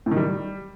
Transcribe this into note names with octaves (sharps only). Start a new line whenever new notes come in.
A2
D#3
G3